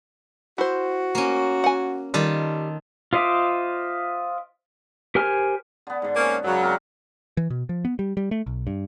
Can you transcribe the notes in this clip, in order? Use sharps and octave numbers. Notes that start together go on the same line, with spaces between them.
E4 F#4 C5
A#3 C#4
F#5 G#5
D#3 G3 F4 A4
F4 C5 D#5 E5 D6
G4 A#4 C5 G#5 F6
D3 B3
G#2 D3
A#3 C4 C#4
F#2 C#3 F#3
C4 A#4 D5
E3
B2
F3
B3
G3
G3
A3
B1
G2